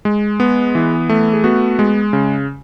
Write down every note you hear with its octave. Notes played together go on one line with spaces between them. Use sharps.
G#3
B3
E3
A3
G#4
B3 F#4
G#3
C#3